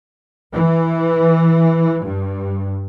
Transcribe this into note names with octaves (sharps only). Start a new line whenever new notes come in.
E3
G2